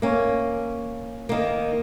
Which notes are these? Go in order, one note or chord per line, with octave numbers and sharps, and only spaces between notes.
A#3 C#4
D#3 A#3